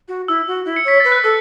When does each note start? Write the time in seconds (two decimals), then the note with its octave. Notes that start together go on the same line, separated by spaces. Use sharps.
0.08 F#4
0.28 E4 E6
0.47 F#4
0.66 E4
0.76 C#7
0.85 C#5 B6
1.00 B4 A6
1.12 F#6
1.24 A4 E6